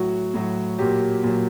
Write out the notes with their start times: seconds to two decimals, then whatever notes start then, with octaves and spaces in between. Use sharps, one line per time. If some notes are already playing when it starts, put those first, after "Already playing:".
Already playing: A2 F#3 F#4
0.34 A2 F#3
0.78 A#2 F#3 G4
1.23 A#2 F#3